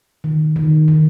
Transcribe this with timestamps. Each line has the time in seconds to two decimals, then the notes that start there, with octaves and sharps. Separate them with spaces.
0.24 D#3
0.56 D#3
0.88 D#3